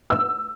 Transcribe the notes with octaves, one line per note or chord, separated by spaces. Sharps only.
E6